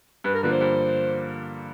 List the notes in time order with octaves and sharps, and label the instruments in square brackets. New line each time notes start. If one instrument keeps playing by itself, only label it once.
[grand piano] G2 [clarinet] B4
[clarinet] A#4
[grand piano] D3 F3 A#3 [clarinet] B4
[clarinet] C5
[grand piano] G2